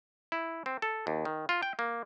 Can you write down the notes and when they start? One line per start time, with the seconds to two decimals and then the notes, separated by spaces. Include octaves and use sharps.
0.32 E4
0.66 C4
0.82 A4
1.07 D#2
1.25 D#3
1.49 F4
1.63 G5
1.79 A#3